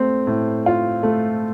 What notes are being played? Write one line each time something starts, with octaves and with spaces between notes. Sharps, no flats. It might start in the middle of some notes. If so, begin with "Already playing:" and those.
Already playing: A3 C4
A2
F4
A3